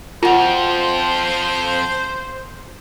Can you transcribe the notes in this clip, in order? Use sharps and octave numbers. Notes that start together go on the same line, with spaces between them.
F2 F3 F4 F#4 C5 A5